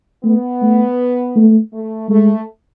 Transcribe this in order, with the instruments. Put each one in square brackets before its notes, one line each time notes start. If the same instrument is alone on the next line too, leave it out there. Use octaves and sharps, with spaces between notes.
[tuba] A3 [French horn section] B3
[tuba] A3
A3
[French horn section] A3
[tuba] G#3 [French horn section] A3